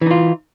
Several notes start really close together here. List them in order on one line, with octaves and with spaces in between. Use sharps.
E3 D#4 F4